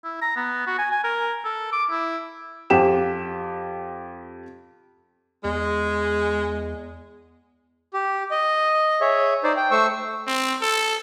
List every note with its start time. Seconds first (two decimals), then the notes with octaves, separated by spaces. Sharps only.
0.04 E4
0.22 A#5
0.36 B3
0.67 F#4
0.78 G#5
0.92 G#5
1.04 A#4
1.45 A4
1.73 D6
1.91 E4
2.70 F2 G4 E7
5.44 E2 G#3
7.94 G4
8.31 D#5
9.01 G#4 C#5 E5
9.43 D#4 C5 D5
9.57 G5
9.71 A3 C5 C#6 E6
10.27 C4
10.62 A4